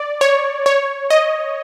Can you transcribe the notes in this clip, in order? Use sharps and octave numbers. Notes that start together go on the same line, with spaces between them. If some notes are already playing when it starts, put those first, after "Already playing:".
Already playing: D5
C#5
C#5
D#5